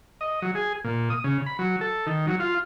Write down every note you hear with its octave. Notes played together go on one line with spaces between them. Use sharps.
D#5
F#3
G#4
A#2
D#6
C#3
B5
F#3
A4
D#3
F#3
F4